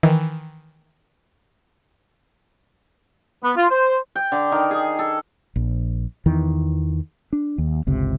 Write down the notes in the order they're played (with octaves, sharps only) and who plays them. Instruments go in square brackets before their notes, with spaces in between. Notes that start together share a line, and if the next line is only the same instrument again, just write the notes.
[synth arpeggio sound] D#3 E3
[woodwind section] B3
F4
C5
[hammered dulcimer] G5
D3
D#3
G#4
A4
[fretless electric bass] A#1
E2 D#3 E3
D4
D#2
G1 C#2 C3